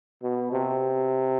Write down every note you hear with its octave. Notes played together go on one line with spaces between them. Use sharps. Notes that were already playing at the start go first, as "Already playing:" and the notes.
B2
C3